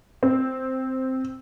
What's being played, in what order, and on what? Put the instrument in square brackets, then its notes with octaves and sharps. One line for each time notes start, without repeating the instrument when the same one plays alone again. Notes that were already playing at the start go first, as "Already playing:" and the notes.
[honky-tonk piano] C4